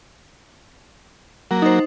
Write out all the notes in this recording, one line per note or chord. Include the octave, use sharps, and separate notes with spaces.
F#3 A#3
D#4 C5